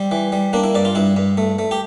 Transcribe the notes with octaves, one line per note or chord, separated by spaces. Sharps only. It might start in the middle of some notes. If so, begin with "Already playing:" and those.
Already playing: G3 C4
E3
G3
A#3 D4
E4
G2 D5
F4
G2 E4
G2
A3
A3
G4